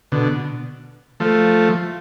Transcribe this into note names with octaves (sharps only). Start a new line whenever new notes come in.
B2 D3
F3 A3